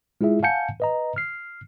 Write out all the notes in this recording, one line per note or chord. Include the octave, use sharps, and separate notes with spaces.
G#3 E4 F4 G#4 E5
F5 F#5 G#5 A5 G6 C#7
B4 D#5 A#5
F6 C7